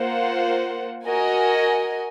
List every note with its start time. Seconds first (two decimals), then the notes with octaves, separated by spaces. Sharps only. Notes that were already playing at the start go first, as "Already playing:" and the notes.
Already playing: A#3 F4 C5 F#5
1.05 F#4 A#4 D#5 G#5